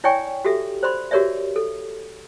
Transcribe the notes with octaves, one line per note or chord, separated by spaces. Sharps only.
E4 C#5 D5 G5 G#5 C#6
F#4 G4 A4 E5
C5 D5 B5 C6
F#4 G4 A#4 C#5 D5 E5
A4